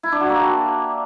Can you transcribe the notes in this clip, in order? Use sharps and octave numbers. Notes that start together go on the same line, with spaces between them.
E4
D4
F#4
A#3
G4